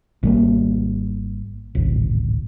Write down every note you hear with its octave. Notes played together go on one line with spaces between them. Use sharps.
G#1 G3 A#3
D1 G#1